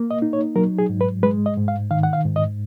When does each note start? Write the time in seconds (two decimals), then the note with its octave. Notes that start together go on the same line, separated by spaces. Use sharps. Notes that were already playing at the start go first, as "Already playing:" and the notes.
Already playing: A#3
0.11 D#5
0.22 D#4
0.33 C#5
0.55 F#3 A#4
0.79 G#4
0.90 G#2
1.01 B4
1.23 G#3 B4
1.46 D#5
1.57 G#2
1.68 F5
1.91 D#3 F5
2.03 F#5
2.13 F5
2.25 G#2
2.36 D#5